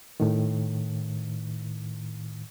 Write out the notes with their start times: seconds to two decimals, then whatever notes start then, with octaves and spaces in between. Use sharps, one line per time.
0.20 A2 D#3